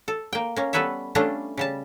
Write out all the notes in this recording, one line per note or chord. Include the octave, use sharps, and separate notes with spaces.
A4
A#3 G5
A#3 C#4
G3 B3 A4 B4 C#5 E5
G3 A3 C#4 D4 F4 A4
C#3 G3 A5